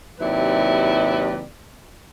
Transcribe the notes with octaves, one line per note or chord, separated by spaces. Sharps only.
D#2 C3 F#3 E4 B4 D5